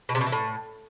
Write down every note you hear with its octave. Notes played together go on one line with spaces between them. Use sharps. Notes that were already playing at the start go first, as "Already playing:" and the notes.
B2
C3
B2
E3
A2